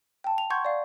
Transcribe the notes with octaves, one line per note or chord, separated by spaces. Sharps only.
G5 A5
F7
F#5 C6 C#6 G6 G#6
D5 F5